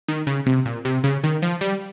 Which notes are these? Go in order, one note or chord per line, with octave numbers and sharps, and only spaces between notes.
D#3
C#3
C3
A#2
C3
C#3
D#3
F3
G3